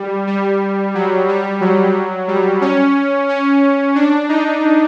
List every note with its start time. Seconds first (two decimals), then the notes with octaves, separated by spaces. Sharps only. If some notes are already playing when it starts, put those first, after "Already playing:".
Already playing: G3
0.27 G3
0.95 F#3
1.29 G3
1.61 F#3
2.28 G3
2.61 C#4
3.29 C#4
3.95 D4
4.29 D#4